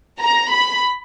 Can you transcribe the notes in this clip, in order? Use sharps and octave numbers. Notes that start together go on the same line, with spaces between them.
A#5
B5